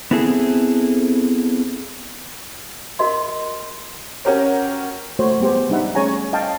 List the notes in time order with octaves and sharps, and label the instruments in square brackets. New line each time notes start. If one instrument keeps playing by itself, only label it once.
[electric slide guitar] B3 C4 E4 G#4 A4
[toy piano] F#4 A#4 D#5 C6
[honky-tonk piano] C#4 F#4 G4 A#4 C#5
[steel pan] A3 F#4 C5 C#5
G3 B3 G4 G#4 C5
G3 D4 D#4 E5 F#5 B5
A3 C#4 G#4 C#5 G#5 A#5
D#5 F5 G5 A5